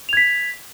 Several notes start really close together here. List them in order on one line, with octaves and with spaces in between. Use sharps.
F7 G#6 B6